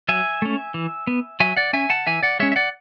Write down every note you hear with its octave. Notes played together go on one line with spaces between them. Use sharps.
F#3 E5 G#5
A3 C#4
E3
B3
F#3 E5 G#5
D5 F#5
C#4 E5 G#5
F#5 A5
E3 E5 G#5
D5 F#5
G#3 C#4 C#5 E5
E5
D5 F#5